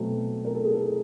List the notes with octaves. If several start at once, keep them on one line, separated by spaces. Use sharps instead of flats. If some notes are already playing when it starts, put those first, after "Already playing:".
Already playing: B2 F#3 A3 C4
A#4
A4
G#4
A4